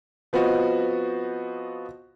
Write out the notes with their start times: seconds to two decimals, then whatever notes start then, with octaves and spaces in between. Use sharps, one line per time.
0.33 F3 B3 C4 F#4 D#5